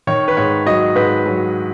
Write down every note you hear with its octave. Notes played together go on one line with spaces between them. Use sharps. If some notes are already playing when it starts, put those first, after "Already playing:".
D#3 C#5
B4
G#2 C#5
F#3 D#5
G#2 B4
F#3